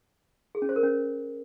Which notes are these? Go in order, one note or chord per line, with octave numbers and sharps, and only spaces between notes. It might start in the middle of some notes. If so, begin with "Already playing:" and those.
G#4
C#4
C5
A#4
C#4